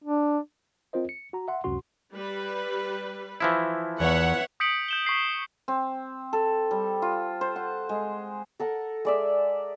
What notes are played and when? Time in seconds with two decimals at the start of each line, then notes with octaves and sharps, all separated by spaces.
0.04 D4
0.93 C4 F4 A#4 C5 D#5
1.09 C#7
1.33 F#4 A#5
1.48 E5 F#5 C6
1.64 G1 C#2 F#2 C3 F#4 C6
2.12 G3 B4
3.40 E3 F3 E4
4.00 E2 C#5 E5 F#5
4.60 D#6 G6 B6 C#7 D7 F#7
4.89 G6 E7 G7
5.06 C#6 B6 C7
5.68 C4
6.33 A4
6.71 G3
7.02 F4
7.41 C5
7.56 F#5
7.89 G#3
8.60 A4 A#4 F#5
9.05 G#3 D5 E5